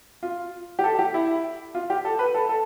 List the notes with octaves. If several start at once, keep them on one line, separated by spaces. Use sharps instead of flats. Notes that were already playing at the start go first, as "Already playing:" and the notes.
F4
G4
A4
G4
E4
F4
G4
A4
B4
A4
A4